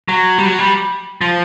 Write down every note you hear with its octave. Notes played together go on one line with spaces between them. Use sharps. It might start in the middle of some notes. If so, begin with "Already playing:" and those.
F#3
G3
F#3
G3
F3